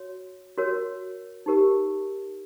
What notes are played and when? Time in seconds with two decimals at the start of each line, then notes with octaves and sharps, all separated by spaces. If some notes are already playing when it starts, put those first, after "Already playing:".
Already playing: F#4 C#5
0.58 F#4 A#4 C#5
1.46 D#4 G4 A#4